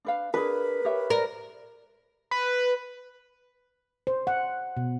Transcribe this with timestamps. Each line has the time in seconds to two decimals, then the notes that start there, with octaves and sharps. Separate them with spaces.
0.05 D4 B4 F5
0.34 D4 G#4 A#4 B4
0.85 G4 C#5 E5
1.10 A#4 D5
2.31 B4
4.07 C5
4.27 F#5
4.77 B2